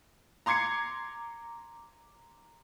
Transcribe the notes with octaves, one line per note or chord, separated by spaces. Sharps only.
A#5 C6 D6 G#6 C7 C#7